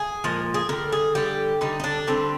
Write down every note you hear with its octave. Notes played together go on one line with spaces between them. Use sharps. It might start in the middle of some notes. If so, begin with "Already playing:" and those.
Already playing: G#4
A#2 F3 G#3 A#4
G#4
D3 G3 A#4
G#4
D3 G3 G4
D3 G3 D#4
D#4
D4
D3 G3 C4